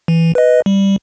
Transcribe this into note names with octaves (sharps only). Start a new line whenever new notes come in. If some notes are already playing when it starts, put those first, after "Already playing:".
E3
B4 D#5
G3